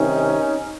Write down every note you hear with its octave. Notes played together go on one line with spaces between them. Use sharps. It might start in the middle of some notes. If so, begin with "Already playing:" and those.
Already playing: C2 C3 D#3 C#4 D#4